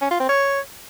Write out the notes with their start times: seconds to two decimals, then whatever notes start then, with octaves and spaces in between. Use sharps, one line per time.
0.02 C#4
0.11 F4
0.20 C4
0.29 C#5